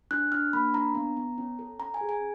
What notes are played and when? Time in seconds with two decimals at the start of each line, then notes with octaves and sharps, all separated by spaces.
0.11 D4 F#6
0.32 D4 F6
0.53 A#3 B5
0.74 D4 A#5
0.95 B3
1.17 B3
1.38 C#4
1.59 A4
1.80 C#4 A#5
1.94 G#5
2.01 G#4
2.09 G#5